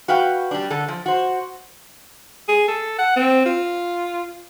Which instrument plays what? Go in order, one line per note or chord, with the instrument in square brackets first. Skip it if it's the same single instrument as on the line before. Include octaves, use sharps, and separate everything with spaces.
[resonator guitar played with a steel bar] F#4 B4 F5 G5
G3 D4
D3 A4
F3
F#4 C5
[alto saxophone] G#4
A4
F#5
C4
F4